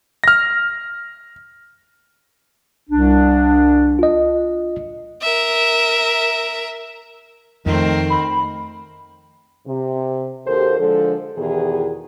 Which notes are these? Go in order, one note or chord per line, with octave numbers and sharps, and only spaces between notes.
F6 A#6
C2 D4
F4 D#5
A#4 E5
F2 D#3 A3 C4 A#4
B5
C3
D#2 F#4 G4 A4 A#4 C5
D3 F3 G#3 A4
E2 B2 D#3 E3 G4 G#4